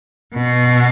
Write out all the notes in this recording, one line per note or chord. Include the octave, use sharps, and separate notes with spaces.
B2